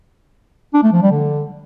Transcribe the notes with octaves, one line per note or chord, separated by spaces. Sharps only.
D4
A3
F3
G3
D3